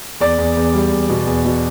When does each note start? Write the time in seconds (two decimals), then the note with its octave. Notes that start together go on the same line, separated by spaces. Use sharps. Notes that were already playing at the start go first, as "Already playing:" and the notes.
0.20 E2 D5
0.38 E2
0.57 E2
0.73 G3
0.91 E2
1.09 B2
1.26 E2
1.45 B2